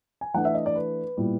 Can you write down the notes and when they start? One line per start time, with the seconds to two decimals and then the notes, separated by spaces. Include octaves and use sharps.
0.21 G#5
0.34 E3 A3 D4 F#5
0.45 E5
0.55 D#5
0.66 D5
0.76 B4
1.17 A#2 G3 B3 E4